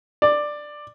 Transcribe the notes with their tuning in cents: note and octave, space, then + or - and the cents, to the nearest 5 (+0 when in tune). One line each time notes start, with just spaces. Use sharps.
D5 +10